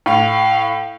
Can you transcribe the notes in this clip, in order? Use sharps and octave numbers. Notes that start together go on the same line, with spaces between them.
A2 F5